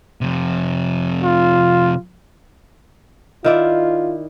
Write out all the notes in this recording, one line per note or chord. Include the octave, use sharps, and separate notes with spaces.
F2 C3
F4
D#3 E4 F4 D5